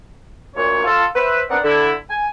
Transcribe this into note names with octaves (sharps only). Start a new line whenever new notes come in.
D2 A#2 C#5
F4 A4
B4 C5 E5
B3 C4 D4 A#4 D5 F#5
D3 E4
G#5